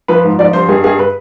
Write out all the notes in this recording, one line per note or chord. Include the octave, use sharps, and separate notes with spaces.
F3 B4
G#2
F3 D5
G2 C5
G2 G#4
G2 G#4
B4